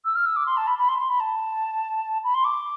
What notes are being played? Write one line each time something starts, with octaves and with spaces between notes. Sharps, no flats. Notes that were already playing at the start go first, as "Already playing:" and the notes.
E6
F6
E6
D6
C6
A5
B5
B5
C6
C6
B5
A5
B5
C6
D6